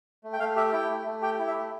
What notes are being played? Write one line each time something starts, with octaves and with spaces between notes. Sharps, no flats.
A3
G5
A3 F5
G4 E5
E4 G5
A3
A3
G4 G5
E4
E5
A3